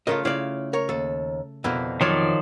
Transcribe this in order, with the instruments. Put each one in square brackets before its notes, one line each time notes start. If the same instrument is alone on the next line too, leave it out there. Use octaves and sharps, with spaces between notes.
[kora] C#3 A3 F4 [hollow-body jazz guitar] A#4 D#5
[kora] C#3 F5 [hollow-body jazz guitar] E4 D5
[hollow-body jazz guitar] A#4 C#5
[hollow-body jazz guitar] D#2 [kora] A4
[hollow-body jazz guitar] F2 B2 D3 [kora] E4 A#4
[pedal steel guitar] D#3 F3 D5 [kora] F#3 F4 C#5